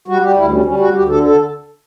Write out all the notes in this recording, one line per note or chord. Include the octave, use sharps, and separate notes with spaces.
G3 F#4
G3 G4
D2 E4
G3 C#4
G3 C#4
D2 F#4
D2 G4
D3 A4
A4